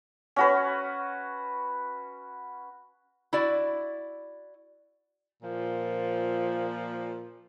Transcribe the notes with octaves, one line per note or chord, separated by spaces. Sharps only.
C#4 F#4 B4
E4 F#4 D5
A#2 F3